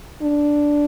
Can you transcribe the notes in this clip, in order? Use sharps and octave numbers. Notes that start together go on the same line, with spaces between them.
D4